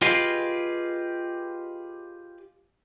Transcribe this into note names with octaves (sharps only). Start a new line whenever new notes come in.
F4 G4 G#4 B4 D#5 F5